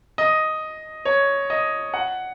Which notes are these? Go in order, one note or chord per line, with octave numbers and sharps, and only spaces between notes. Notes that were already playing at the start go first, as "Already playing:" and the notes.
D#5
C#5
D#5
F#5